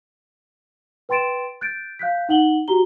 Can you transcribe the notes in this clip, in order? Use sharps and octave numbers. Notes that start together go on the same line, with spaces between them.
B4 G5 C6 A6 D7 E7
F#6 G6 A6 D7
F5 F#6 G6 B6
D#4 F#5 F#7 G7
F#4 G4 A#5 G7